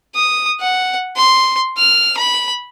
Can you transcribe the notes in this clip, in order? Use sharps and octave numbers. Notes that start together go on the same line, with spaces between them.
D#6
F#5
C6
F6
B5